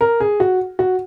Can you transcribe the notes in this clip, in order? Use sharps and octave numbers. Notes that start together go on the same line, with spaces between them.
A#4
G#4
F#4
F#4